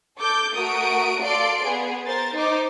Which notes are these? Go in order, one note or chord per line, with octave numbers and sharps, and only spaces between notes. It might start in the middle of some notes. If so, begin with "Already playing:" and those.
A4 D6 G6
A3 F#4 A#4 D#6 D7
A4 D5 F5 C6 D7
B3 G#4
A#4 C5 A6
D#4 C5 D6